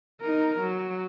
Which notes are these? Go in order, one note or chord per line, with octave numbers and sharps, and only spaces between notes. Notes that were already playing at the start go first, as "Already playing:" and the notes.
D#4 A#4
F#3